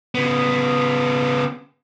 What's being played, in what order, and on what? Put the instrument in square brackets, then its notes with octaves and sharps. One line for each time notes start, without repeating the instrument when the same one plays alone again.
[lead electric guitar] C#3 B3